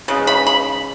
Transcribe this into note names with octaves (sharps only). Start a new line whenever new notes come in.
C#3 G#3
B5
B5